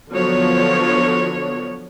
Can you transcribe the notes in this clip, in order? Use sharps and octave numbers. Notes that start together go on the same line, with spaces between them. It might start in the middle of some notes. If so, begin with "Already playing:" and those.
D3 F3 F#3 B3 C#5